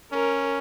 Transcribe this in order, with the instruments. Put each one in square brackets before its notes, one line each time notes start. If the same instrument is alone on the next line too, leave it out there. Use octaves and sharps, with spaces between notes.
[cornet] C#4 [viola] A#4